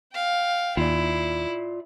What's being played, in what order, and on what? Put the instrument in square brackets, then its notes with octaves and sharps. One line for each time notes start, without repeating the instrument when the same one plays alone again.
[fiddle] F5 G5
[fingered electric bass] D#2 [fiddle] E4 [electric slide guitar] F4 D5